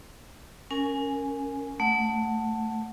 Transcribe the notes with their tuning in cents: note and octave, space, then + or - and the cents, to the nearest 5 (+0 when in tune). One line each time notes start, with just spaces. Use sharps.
C#4 +0 A#4 -10 G#5 +0
A3 +10 F#5 +0